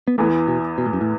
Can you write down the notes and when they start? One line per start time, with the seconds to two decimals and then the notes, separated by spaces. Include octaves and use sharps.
0.08 B3
0.18 E2 E3 A3 B3
0.48 B2
0.78 B2
0.86 A2
0.93 F#2
1.01 A2